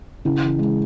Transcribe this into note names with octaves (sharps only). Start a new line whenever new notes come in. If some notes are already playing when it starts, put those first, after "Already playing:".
C#3 E4
E3
G#3